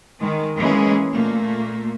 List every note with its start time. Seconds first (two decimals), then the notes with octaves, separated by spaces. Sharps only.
0.20 D#3 G#3
0.57 E3 G#3 A#3 C#4 G#4
1.12 A#2 A3 A#3